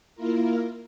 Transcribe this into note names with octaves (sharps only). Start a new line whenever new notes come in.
A#3 E4 F4 A#4